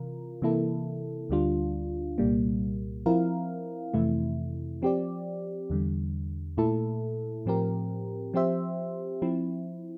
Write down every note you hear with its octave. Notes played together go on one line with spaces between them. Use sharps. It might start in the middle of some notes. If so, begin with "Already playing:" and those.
Already playing: C3 E3 F4 A#4
C3 E3 A#3 E4 A4
D2 D3 G3 D4 F4
C2 A#2 G3 A#3
F3 C4 E4 A#4 F5
F2 C3 E3 A3 E4
F3 C4 G4 D5
E2 D3 G3
A#2 A3 E4 A4
A2 F3 C4 G4 A#4
F3 C4 G4 C5 E5
F3 C4 E4